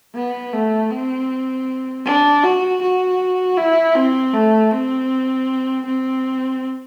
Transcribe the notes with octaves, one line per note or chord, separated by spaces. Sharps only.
B3
A3
C4
D4
F#4
F#4
E4
C4
A3
C4
C4